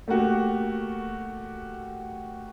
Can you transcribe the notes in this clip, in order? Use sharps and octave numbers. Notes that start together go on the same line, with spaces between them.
A3 A#3 F#4 G4